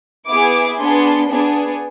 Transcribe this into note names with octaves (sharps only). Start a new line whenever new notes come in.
B3 E4 G#4 D6
B3 D4 G#4 C6
B3 D4 G#4